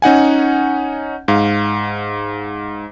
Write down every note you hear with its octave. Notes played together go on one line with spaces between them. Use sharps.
C#4 D#4 F#5 G#5
G#2 F5